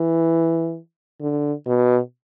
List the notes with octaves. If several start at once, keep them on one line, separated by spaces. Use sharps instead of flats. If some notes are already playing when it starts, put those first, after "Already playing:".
Already playing: E3
D3
B2